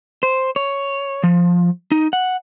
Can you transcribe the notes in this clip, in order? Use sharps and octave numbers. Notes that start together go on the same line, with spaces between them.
C5
C#5
F3
D#4
F#5